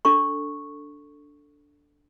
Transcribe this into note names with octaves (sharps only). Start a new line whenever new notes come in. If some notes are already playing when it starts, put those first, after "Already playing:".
D4 A4 C#6